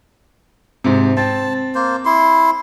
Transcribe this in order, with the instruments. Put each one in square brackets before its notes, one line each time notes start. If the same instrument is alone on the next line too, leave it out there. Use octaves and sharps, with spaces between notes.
[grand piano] G#2 C3
[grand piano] C4 [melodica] A5
[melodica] A#3 C5
E4 C6